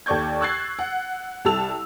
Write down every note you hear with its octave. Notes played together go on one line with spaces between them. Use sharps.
D#2 A4 D5 C#6 G6 G#6
C#6 E6 F#6 G#6 A6 C7
F#5
C2 G3 A4 A5 E6 F7